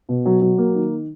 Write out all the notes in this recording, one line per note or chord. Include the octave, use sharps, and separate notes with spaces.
B2
F#3
F#3
A#3
D#3